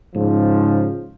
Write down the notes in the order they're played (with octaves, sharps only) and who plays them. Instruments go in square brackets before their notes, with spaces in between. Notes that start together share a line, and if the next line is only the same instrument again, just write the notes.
[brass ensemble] G#2 C#3 F3